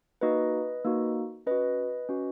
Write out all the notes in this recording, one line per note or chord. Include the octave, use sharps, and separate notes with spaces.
A#3 D#4 F#4 B4 D#5
A#3 D#4 F#4
C#4 F#4 B4 D#5
C#4 F#4